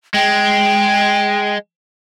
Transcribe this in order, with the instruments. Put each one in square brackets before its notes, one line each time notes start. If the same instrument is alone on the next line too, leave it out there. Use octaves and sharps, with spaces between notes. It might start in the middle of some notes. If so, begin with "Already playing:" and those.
[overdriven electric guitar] G#3 [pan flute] G5